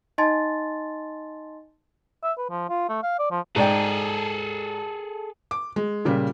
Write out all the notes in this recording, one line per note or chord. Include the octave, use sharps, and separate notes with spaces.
D#4 D#5 G#5 A5 C6 A6
E5
B4
F3
F4
A3
F5
D5
F3
G#2 G#4 A4 D5 G5
D6
G#3
A#2 C#3 G3